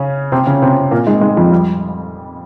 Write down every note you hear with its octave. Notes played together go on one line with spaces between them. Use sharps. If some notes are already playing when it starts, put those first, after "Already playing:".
Already playing: C#3 C#4
C3 C4
C#3 C#4
C3 C4
A#2 A#3
G#2 G#3
G#2 G#3
F2 F3
G3